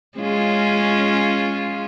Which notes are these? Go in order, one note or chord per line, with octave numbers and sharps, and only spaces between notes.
G#3 C#4 F4